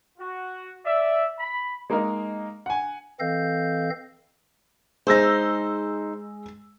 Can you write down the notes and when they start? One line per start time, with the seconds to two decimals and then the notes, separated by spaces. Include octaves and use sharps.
0.19 F#4
0.85 D5 E5
1.39 B5
1.90 G#3 A#3 D#4 A#4 D#5
2.66 F#5 G#5
3.20 E3 C4 A4 D#5 F5 G6
5.07 G#3 D#4 C5 E6 A#6